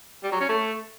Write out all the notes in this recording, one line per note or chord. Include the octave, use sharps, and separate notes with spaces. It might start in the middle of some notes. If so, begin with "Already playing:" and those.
G3
F#3
C#4
A3